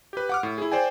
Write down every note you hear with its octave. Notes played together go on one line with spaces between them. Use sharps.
G4 B4
F#5 D6 F6
A2
E4 G#4
C5 D5 G5 G#5